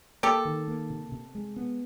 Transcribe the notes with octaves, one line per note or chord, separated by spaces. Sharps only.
A#3 G4 A4
D#3
A#3
C3
C3
G#3
B3